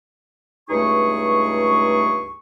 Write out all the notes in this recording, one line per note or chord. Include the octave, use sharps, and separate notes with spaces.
C#2 G2 A3 D#4 G#4 C#6